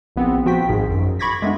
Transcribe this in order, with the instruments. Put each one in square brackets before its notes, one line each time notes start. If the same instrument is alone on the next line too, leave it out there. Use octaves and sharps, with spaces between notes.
[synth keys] A#1 B3 C4
F3 F#4 G5 B6
G#1 G#2 G#4
F#2
B5 C#6 D6 G#6 A#6 B6
G#3 A3 B3 D4